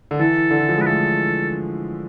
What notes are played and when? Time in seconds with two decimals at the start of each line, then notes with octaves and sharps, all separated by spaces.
0.11 D3
0.19 E3 A4
0.51 D3
0.59 E3
0.69 F3
0.77 G#3
0.81 B4
0.86 A3 A4